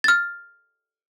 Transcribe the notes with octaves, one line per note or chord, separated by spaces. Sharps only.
F6 A6